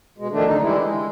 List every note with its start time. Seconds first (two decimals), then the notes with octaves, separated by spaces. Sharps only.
0.18 B2 G#3
0.31 F2 D#3 A3 D4
0.46 D3 D#4
0.62 E3 G3 G#3 E4
0.81 G#3